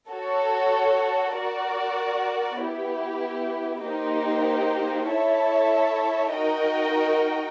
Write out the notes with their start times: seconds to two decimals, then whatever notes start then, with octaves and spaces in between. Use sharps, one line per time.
0.10 F#4 A4 C#5
1.35 F#4 A#4 D5
2.59 B3 E4 G4
3.84 A#3 D#4 G4 C5
5.09 E4 A4 C#5 E5 A5
6.34 D#4 F#4 A#4 D#5 G5